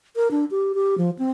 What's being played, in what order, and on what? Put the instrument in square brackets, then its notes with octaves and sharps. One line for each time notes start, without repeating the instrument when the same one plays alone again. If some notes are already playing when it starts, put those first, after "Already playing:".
[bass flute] A#4
D4
G4
G4
F3
C4